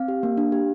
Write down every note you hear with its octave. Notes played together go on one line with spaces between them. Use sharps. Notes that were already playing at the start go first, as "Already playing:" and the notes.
Already playing: C4 F5
G4
A#3
D4
G4